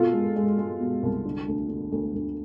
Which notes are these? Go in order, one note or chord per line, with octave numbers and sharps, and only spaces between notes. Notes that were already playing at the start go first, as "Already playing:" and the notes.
Already playing: B2 F4 A4
G#3
G#3
G#3
B2
C2
D3
D2
D3
D2
D2